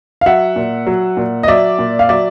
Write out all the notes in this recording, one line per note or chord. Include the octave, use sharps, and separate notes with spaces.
F5
F#3 E5 F#5
A#2
F#3
A#2
D#5
F#3 D5 E5
A#2
F5
F#3 D5 E5